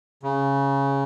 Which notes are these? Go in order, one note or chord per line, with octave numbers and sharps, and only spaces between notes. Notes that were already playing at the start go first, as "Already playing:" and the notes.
C#3